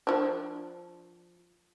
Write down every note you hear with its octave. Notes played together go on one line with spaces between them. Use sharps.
F3 D4